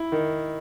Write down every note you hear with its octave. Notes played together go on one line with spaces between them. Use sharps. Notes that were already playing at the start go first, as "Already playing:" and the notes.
Already playing: E4
D#3